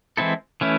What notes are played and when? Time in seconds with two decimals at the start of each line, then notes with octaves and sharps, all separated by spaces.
0.17 E3 G#3 C4 E4 A4
0.61 E3 A3 C#4 E4